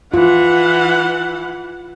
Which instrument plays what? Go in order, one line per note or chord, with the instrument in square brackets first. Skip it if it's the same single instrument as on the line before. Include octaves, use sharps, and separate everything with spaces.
[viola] E3 F#5 [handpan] F4